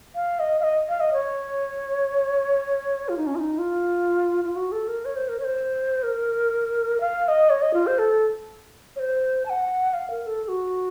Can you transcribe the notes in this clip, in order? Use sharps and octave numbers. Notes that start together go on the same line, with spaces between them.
F5
D#5
F5
D#5
F5
D#5
C#5
F4
D#4
C#4
F4
D#4
F4
F4
F#4
A4
A#4
C#5
C5
A#4
C#5
C5
A#4
F5
F5
D#5
C#5
D#5
F4
C5
A4
C#5
C5
A5
F#5
F5
A#4
A4
A4
F#4